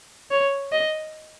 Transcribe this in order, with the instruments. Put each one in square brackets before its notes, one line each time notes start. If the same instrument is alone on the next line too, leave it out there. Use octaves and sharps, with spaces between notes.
[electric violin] C#5
D#5